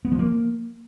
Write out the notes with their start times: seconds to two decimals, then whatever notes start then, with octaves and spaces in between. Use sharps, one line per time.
0.05 B3
0.12 F3
0.19 A#3